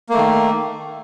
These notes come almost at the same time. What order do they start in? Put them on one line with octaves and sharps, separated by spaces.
A#3 A3 D#3